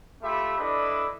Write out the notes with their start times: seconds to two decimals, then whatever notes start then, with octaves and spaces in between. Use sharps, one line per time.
0.23 A3 F4 G4 E5 B5
0.58 D4 E4 A4 B4 D5 D#5